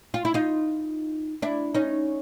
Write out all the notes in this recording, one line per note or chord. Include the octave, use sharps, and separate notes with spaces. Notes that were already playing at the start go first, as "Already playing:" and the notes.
F4
E4
D#4 F4
D4 E4
C#4 D#4